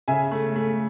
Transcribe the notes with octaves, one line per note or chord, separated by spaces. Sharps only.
C#3 E5 G#5
A3
A3